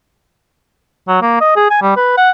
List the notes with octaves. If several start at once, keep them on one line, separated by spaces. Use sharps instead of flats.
F#3
A#3
D#5
G#4
G#5
G3
B4
F#5